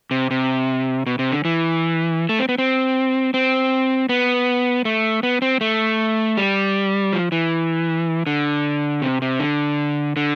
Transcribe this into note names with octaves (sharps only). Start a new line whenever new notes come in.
C3
C3
B2
C3
D3
E3
A3
C4
B3
C4
C4
B3
A3
B3
C4
A3
G3
F3
E3
D3
C3
C3
D3
D3